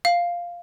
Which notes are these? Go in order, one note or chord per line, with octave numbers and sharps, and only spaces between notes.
F5